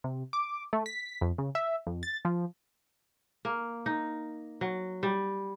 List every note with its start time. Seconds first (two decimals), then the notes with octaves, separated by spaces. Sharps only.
0.04 C3
0.33 D6
0.73 A3
0.86 B6
1.21 F2
1.38 C#3
1.55 E5
1.87 F2
2.03 A6
2.25 F3
3.45 A#3
3.86 D#4
4.61 F#3
5.03 G3